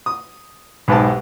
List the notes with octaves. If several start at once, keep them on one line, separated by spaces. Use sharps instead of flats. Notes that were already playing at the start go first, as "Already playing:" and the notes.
D#6
B1 G#2 B3 G4 A5